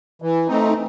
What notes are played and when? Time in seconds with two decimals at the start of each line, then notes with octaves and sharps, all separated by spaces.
0.22 E3
0.48 A3 C4 D#4